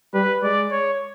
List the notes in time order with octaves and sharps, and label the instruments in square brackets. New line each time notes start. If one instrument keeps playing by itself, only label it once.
[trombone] G3 [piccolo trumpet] B4
[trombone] G#3 [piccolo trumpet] D5
[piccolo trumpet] C#5